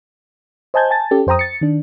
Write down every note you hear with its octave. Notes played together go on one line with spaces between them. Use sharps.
C5 D#5 G#5 A5 G6 G#6
G#5 A5 A6
C#4 G4 A4
F2 C5 G5 A#5 D#6
A6 C#7
D#3 D4